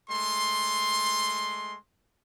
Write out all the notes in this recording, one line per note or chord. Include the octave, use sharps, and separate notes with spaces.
G#3 A3 C6